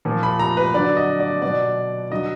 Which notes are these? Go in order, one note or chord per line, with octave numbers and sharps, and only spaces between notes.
A#2 F3
B5
A#5
B4
D3 F#3 D5
D#5
D5
B2 F#3 D5
D3 F#3 D#5